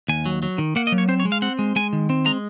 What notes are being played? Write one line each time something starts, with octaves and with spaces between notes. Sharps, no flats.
D#2 G#5
F#3
F#3
D#3
A#3 F#5
D#5
F#3
C#5
C4 C5
C#5
G#3
F5
C4 F#5
G#3
G#3 G#5
D#3
C4
G#3 A#5